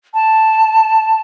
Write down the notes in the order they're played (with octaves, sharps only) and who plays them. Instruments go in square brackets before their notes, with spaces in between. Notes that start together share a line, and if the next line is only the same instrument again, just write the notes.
[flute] A5